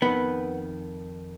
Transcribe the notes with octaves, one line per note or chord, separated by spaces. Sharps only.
F2 D#3 B3